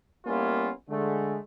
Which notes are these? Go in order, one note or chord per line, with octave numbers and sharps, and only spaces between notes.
G3 A#3 B3 C#4 E4 F4
D3 G#3 A3